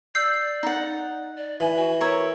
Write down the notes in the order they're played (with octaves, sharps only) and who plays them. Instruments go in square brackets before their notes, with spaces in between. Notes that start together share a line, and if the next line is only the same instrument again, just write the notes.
[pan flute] D5 [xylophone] E6 G6 C7
[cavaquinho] D#4 F#5
[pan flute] D5
[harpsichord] E3 [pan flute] G#5
[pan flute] F#4
[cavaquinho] A#4 C#5 E5